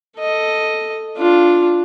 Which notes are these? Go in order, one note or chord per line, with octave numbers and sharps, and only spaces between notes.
A4 D#5
D4 F4